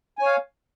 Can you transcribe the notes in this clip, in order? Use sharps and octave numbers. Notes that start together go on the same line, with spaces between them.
C#5 F5 G#5